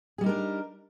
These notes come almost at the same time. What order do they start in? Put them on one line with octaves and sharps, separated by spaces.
G#4 G3 D#4 A#4 D4